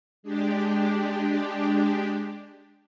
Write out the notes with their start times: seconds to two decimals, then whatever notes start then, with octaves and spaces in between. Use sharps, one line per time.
0.23 G#3 D4 G4